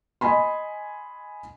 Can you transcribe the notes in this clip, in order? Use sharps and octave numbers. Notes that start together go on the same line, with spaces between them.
D#5 G#5 B5 C6